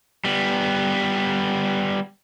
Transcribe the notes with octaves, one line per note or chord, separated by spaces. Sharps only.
G3 B3